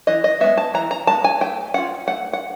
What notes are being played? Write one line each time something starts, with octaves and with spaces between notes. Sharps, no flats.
E3 D#5
D#5
G#3 B3 E5
A5
E3 A#5
A#5
G#3 B3 A5
G#5
A3 G5
C#4 F4 F#5
A3 F#5
F#5